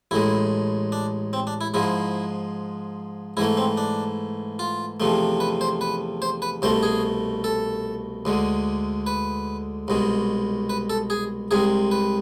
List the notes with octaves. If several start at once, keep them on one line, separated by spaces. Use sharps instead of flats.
A1 A2 G#3 E4
D4
C4
D4
E4
G#2 F3 G#3 E4
G#2 E3 A3 E4
C4
D4
F4
E2 C3 F3 A3
B4
C5
B4
C5
B4
C2 B2 A3 C5
G#4
A4
D2 D3 G#3
B4
C2 B2 G#3
B4
A4
G#4
C2 C3 G#3 G#4
B4